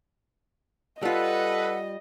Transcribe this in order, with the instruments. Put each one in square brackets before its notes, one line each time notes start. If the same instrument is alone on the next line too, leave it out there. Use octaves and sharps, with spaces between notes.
[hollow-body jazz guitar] G3 F4 [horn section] A4 B4 [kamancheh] D#5 [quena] F#5